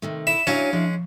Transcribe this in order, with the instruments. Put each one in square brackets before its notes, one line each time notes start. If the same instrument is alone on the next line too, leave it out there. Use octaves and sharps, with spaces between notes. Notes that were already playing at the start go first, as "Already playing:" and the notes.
[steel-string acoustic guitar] C3 D#3 A3
[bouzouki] E4 [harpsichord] E5
[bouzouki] F#3 G#5 [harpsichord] C#4 [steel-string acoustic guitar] D4 E4 F5 [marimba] E5
[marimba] F3 [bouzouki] G#3